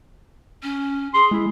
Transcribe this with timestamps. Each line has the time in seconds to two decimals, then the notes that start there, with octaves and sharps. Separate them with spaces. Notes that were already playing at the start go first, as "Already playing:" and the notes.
0.63 C#4
1.14 G#4 C6
1.31 G#3 E4